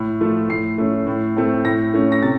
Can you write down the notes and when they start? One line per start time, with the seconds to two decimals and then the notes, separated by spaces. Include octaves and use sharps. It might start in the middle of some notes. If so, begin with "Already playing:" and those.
Already playing: A2
0.21 F3 A3
0.49 A2 C7
0.78 A3 C#4
1.07 A2
1.37 A3 C4
1.65 A2 A#6
1.94 A3 C#4
2.12 A#6
2.22 C3 A6